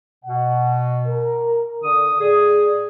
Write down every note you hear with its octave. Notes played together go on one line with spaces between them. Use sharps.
B2 F#5
A#4
D3 D#6
A2 G#4 D5